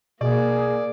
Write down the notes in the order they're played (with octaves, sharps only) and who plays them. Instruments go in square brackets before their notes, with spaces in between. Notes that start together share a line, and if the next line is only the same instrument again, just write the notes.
[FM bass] B2 [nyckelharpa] A#3 [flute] G#4 [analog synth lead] D5